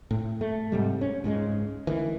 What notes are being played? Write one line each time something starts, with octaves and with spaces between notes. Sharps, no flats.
A2
A3
G#2 C3 G3
C#4
C#2 G#2 C#3 G#3
D2 D#3 E3